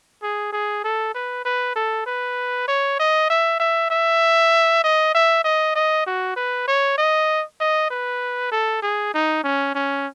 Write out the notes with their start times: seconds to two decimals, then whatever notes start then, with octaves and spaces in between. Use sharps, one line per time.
0.23 G#4
0.52 G#4
0.84 A4
1.15 B4
1.45 B4
1.76 A4
2.06 B4
2.68 C#5
2.99 D#5
3.30 E5
3.60 E5
3.90 E5
4.84 D#5
5.14 E5
5.44 D#5
5.75 D#5
6.07 F#4
6.36 B4
6.68 C#5
6.98 D#5
7.60 D#5
7.90 B4
8.52 A4
8.83 G#4
9.14 D#4
9.44 C#4
9.75 C#4